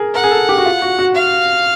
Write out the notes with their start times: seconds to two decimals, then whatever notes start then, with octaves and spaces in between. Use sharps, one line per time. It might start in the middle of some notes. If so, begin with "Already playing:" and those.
Already playing: G#4 A#4
0.14 A#4 F#5
0.24 G#4
0.31 A4
0.49 G4
0.58 F#4
0.66 F4
0.82 F#4
0.99 F#4
1.15 F5